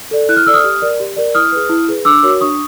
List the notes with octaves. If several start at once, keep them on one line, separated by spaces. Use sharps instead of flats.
A4 D5
E4 F#6
F6
A4 D5 E6
D#6 F6
G4
A#4 D5
G4
A#4 D5
E4 D#6 F6
G#4 B4
E4
G#4 B4
D4 D6 E6
F#4 A#4 C#5
D4 C#6 D#6